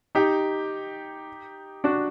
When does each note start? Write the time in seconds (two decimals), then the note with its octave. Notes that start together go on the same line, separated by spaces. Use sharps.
0.15 D#4 G4
1.84 D4 F#4